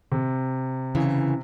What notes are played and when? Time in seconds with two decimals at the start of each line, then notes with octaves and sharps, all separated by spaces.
0.12 C3
0.95 C#3 E3